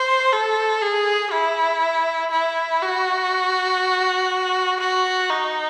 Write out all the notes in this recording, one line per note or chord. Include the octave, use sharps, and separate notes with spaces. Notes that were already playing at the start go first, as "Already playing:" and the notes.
Already playing: C5
A4
G#4
E4
E4
F#4
F#4
D#4